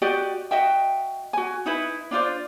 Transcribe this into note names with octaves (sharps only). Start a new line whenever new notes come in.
F#4 G4 D5 D#5
F#4 D#5 E5 G5
F#4 G#5
D#4 E4 B4
D4 F4 C5 D5